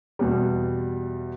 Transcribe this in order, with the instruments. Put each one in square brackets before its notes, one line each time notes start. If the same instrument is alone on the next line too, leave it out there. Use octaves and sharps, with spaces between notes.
[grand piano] E2 B2 G3